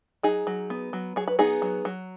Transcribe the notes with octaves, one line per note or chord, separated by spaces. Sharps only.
F#3 D#4 G#4
F#3
B3
F#3
F#3 G#4
B4
B3 D#4 G#4
F#3
F#3